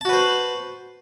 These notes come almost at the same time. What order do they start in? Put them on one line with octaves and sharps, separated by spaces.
A5 F#4 B4 C5